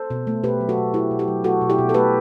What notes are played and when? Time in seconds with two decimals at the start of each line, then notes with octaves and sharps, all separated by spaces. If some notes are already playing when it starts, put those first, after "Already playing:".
Already playing: A4 C5
0.10 B2
0.27 A3
0.44 B2 G4 B4
0.61 F#3
0.69 F#4 A4
0.77 B2
0.94 A3 E4 G4
1.11 B2
1.19 E4 G4
1.28 F#3
1.44 A3 F#4 A4
1.61 B2
1.70 E4 G4
1.78 B2
1.89 A4
1.94 A3 G4 B4